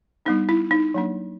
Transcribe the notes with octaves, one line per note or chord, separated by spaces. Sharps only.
G3 B3 D4 D#4
E4
D#4
F#3 A#3 D4